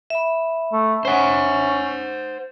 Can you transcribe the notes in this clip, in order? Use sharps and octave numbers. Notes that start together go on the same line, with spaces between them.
E5 B5
A3
C#4 C5 F#5